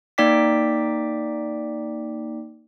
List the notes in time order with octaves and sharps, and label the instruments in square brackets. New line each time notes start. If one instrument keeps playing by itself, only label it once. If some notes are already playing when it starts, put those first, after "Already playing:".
[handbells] A#3 D#4 D5 G5 D6 B6